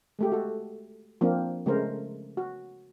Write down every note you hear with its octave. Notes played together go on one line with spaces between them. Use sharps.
G#3 A3 G4
F#4 A4
F3 A#3 C4 D4
C#3 G#3 A3 G#4 A#4 C5
F#4